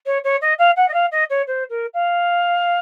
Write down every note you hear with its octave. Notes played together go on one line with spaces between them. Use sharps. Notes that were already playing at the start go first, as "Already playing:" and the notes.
C#5
C#5
D#5
F5
F#5
D#5
F5
D#5
C#5
C5
A#4
F5